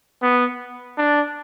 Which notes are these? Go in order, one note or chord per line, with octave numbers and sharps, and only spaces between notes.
B3
D4